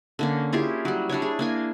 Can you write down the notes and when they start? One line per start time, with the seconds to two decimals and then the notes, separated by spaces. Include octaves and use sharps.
0.19 D3 A#3 C#4
0.52 E4 F4 G4 G#4
0.85 F#3 G3
1.09 G3 D4 E4 C#5
1.22 G#4
1.39 A#3 D4 G#5